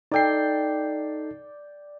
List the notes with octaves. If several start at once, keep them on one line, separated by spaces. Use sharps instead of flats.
D#4 A4 D5 G5 C7